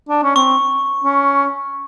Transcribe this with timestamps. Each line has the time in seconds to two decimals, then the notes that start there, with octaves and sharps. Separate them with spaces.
0.09 D4
0.23 C#4
0.36 C4 C#6
1.04 C#4